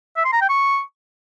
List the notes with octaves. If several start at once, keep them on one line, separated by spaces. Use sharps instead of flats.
E5
C6
A#5
G5
C#6